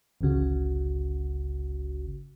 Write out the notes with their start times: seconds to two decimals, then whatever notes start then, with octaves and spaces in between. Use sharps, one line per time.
0.21 G1 C#2 C#3 F#4